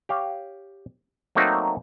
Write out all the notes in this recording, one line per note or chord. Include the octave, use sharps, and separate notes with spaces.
G4 C#5 F5
F#3 A3 A#3 C4 D#4 F#4